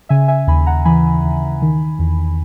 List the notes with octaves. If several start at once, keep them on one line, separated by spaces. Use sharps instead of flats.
C#3 E5 G#5
E5 G#5
D#2 G#5 B5
F#5 A#5
E3 G#5 B5
D#2
D#3
E2